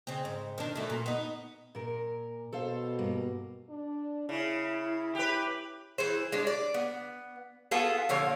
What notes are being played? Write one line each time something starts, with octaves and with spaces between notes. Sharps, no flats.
C#3 C4
G#2
D#3 D4
F#2 A3
A#2
B3 D#4
A#2 A#4
B2 A4 C5 F5
G2 A#3
D4
C#3 E4
G4 B4
E3 G#4 C5
G#3 D4
D5
B3
B3 F4 G#4 A4
A#2 D3 F3 C#5